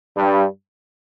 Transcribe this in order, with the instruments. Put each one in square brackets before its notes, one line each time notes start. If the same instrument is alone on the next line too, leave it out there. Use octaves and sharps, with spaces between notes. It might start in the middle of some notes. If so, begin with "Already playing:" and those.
[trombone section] G2